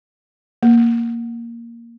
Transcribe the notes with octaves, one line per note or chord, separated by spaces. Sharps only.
A#3